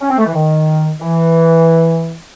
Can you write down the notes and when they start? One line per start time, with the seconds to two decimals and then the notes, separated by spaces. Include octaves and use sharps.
0.01 C#4
0.09 C4
0.18 A3
0.26 E3
0.34 D#3
0.99 E3